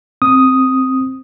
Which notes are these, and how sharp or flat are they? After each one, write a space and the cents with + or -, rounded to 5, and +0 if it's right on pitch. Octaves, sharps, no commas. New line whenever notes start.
C4 +0 D#6 +0